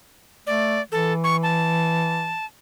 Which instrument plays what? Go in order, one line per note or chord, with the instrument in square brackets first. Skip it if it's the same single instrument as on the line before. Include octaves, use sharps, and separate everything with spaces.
[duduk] A3 [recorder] D5
[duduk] E3 [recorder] A4
[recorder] C#6
A5